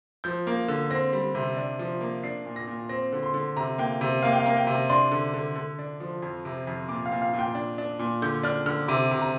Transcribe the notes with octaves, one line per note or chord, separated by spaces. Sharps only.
F3 G6
A#3
D3
C4 A#6
G3
C3
D4
F3
A#3
D4 C7
A#2
A#6
A#2
C4 A#6
D3
C6
D3
C3 A#5
A#3 G5
C3
A#3 F5
G5
F5
A#3
G5
C3
D4 C6
D3
D3
D3
D4
F3
F2
C3
F2
A#2 D6
F5
A#2
F5
A#2
G5
D4
D4
A#2
D3 G6
D4 F6
D3 F6
C3 D6
C3
A#5